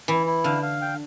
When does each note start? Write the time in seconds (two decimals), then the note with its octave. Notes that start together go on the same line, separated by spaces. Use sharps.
0.08 E3 E4
0.26 E4
0.44 D3 F5
0.62 F5
0.81 G5